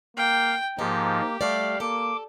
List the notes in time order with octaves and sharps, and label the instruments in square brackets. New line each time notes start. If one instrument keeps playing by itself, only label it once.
[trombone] A#3 [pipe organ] F5 [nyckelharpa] G5
[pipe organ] G#2 F3 [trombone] A#3 [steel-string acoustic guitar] D#4 [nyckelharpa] G4
[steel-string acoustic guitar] G3 D5 [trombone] A3 [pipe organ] F5
[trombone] A#3 [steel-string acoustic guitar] A4 [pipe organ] D6